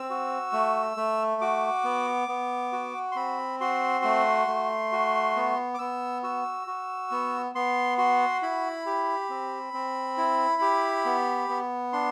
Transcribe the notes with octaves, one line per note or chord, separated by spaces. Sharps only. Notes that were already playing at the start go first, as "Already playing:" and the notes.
Already playing: C4 E6
F#4
A3
A3
F#4 D6
B3
B3
F#4
C6
C4 B5
F#4 C6
A3
A3
F#4
B3
D6
B3 E6
F#4 E6
F#4
B3
B3 C6
F#4 C6
E4 B5
G4
C4
C4
E4
G4
B3
B3
D4 C6